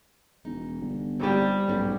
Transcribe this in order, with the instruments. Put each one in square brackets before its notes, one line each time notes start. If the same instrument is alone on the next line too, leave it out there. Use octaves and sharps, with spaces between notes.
[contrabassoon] E1 [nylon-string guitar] D#4
[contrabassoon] G1
[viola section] G3 [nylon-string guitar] C4 D#4 G4
[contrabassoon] B1 [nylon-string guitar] G#2 C#4